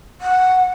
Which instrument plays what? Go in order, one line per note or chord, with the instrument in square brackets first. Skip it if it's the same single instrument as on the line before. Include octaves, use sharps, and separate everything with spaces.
[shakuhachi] F#5